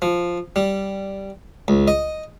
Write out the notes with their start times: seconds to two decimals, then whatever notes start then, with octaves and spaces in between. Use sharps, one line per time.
0.02 F3
0.56 G3
1.68 C#2
1.88 D#5